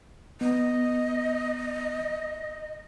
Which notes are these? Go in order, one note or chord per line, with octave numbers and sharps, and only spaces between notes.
B3 D#5